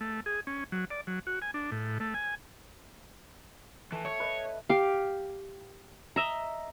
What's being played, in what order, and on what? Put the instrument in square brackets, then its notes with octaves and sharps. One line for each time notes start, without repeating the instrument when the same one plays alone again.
[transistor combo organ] A3
G#4
C#4
F#3
D5
F#3
F#4
G#5
D4
A2
A3
G#5
[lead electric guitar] E3 [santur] A3
[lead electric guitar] C#5 [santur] C#6
[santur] B4 D#5
[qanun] G4 F5
D#5 E5 A#5